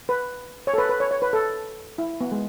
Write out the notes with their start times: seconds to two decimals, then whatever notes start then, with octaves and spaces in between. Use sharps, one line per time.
0.09 B4
0.67 C#5
0.74 A4
0.78 B4
0.89 B4
1.00 C#5
1.11 C#5
1.22 B4
1.33 A4
1.98 E4
2.21 B3
2.32 G#3